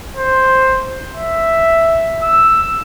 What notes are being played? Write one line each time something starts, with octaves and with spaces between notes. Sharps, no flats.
C5
E5
E6